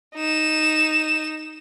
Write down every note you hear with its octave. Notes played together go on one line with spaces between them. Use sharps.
D#4 E7